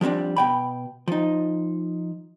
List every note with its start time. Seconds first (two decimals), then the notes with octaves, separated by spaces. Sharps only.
0.01 F3 G3 A#3 C4 D4
0.36 B2 G5 B5
1.08 F3 D#4